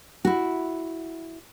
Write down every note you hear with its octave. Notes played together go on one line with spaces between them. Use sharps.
E4 F#4